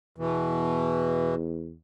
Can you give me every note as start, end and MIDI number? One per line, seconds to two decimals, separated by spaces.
0.18 1.76 40
0.18 1.35 47
0.18 1.35 52